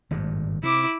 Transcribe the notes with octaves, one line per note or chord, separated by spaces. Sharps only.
G#1 G2 A#2
C3 E4 D6